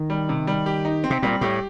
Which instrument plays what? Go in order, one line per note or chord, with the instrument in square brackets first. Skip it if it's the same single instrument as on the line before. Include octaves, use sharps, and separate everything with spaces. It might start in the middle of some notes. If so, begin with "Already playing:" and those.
Already playing: [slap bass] D#3
[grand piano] G3
C3
G3
G4
D#4
C4
[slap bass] C3
[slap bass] A#2 [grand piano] G3
[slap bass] A2 [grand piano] G4